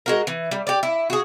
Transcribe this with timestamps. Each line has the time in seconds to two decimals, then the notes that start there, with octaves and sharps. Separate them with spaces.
0.06 G#3 F#4 A#4
0.27 E3
0.51 G3
0.67 G4 D5
0.83 E4
1.10 F#4 G#4